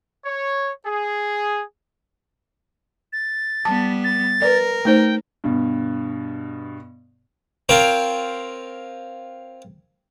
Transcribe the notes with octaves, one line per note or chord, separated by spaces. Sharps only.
C#5
G#4
A6
G3 B3 A5
A6
A#4 B4 D5
A3 D#4 C5 G5
G2 B2
C4 F4 A#4 C#5 F5 G5